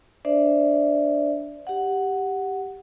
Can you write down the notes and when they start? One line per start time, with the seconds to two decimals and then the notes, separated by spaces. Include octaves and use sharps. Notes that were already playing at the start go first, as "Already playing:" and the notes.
0.25 D4 C5 D5 E5
1.67 G4 F#5